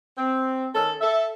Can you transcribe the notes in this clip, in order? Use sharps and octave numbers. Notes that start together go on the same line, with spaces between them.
C4
D#3 C#4 A4
A4 E5